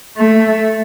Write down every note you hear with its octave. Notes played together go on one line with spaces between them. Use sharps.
A3